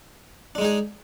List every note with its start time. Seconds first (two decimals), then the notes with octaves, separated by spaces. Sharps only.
0.55 D4
0.58 G#3
0.61 D#4
0.64 G#4